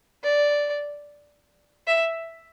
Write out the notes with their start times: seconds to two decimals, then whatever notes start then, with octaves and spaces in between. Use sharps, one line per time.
0.23 D5
1.87 E5